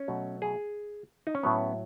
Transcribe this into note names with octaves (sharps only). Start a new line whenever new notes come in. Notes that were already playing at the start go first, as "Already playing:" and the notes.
Already playing: C#4
B2 F#3 A3
G#4
D#4
C#4
A2 F#3 B3